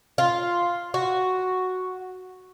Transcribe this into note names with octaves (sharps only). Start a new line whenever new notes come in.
F4
F#4